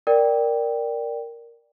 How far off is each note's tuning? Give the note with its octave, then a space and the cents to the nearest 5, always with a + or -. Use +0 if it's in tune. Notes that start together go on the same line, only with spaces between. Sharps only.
A#4 +0 D5 +0 G5 +0